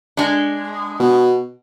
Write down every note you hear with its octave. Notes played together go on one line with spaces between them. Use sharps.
G#3 D4
B2